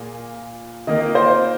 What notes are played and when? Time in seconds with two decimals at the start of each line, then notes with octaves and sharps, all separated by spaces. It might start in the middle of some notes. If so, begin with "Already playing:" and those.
Already playing: A#2 A#3 F4 G#4
0.87 D#3 A#3 F4 A#4 D#5
1.15 C5